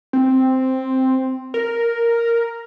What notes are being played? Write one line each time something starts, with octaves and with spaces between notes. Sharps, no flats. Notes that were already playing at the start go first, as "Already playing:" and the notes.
C4
A#4